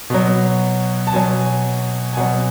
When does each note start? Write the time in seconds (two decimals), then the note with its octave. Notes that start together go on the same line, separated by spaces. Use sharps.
0.10 B2 F#3
1.07 A5
1.13 B2 F#3 G#5
2.13 G#5
2.17 B2 F#3 F#5